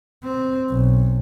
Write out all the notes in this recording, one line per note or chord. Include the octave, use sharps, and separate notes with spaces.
C4
B1